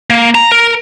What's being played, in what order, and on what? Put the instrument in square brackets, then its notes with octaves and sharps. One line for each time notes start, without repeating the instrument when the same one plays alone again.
[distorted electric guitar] A#3
A#5
A#4